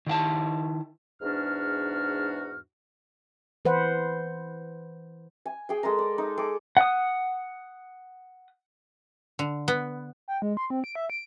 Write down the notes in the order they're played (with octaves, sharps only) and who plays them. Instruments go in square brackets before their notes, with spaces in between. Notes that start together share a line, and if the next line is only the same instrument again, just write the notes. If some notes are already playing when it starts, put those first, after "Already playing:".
[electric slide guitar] D#3 E4 F#5 A5
[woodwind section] E2 G#2 D4 F#4 F6
[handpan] E3 B4 C5 F#5
[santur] G#5
G#4 G5
G#3 A4 A#4 A#5
D5
D#4
G#4 A4 D6
[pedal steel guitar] F#5 D#6
[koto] D3
B3
[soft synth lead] G5
G#3
C6
C4
D7
E5
D7